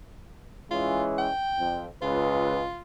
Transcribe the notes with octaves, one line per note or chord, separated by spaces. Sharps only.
E3 G#3 C#4 F4
G5
F2
C#2 F4 B4